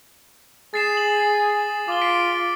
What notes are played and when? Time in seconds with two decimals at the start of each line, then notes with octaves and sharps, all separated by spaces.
0.74 G#4 A6 C7 E7
0.97 F#7
1.88 F4 D6 G7
2.01 B6 C7 D7